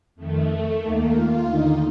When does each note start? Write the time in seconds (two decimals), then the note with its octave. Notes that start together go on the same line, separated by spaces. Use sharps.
0.15 F2 D#3 A3
0.80 D#2 D#3 A#3
1.12 F4
1.43 D#2 D3 D#4